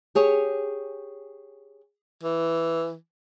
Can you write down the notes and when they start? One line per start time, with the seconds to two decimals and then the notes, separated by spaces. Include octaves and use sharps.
0.15 G4 G#4 C#5
2.23 E3